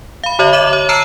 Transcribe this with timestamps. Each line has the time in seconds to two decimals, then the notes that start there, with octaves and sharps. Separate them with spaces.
0.24 F5 B5
0.39 D3 C#5 D#5 F#7
0.53 E5 D6 D#7 E7 F#7
0.73 C#5
0.89 A5 A#5 E6 F6 C7 E7